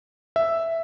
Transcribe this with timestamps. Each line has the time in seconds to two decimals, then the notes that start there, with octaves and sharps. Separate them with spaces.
0.36 E5